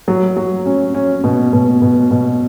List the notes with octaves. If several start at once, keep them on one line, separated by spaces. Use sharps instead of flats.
F#3
F#3
C#4
C#4
B2
B2
B2
B2